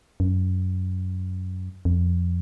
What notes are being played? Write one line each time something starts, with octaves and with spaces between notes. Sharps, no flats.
F#2
F2